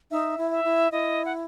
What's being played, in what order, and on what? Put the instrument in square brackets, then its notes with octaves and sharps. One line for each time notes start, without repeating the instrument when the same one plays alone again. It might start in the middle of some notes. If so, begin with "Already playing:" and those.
[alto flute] D#4 [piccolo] E5
[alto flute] E4
[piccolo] E5
[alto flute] E4
[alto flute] E4 [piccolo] D#5
[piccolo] F#5